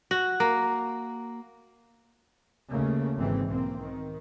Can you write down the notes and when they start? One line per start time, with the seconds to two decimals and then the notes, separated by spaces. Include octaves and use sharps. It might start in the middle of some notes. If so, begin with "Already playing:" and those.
0.11 F#4
0.40 A#3
2.71 D#2 C#3 A3 A#3
3.18 G#1 G#2 E3 C4
3.48 B1 A#3 C4
3.81 D#3